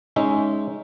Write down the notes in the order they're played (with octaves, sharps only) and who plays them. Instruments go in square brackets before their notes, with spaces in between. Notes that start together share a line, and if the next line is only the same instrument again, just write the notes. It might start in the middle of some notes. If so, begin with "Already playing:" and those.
[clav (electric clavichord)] G#3 C#4 D#4 E5